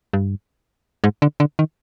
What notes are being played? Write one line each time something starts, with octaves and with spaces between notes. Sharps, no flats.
G2
G#2
D3
D3
D#3